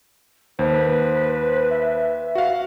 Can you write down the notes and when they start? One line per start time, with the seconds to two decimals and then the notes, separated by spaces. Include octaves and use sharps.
0.59 D#2 B4 C5
1.71 E5
2.35 F#4 F5